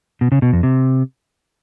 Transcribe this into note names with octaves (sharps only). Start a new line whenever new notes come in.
B2
C#3
B2
F2
C3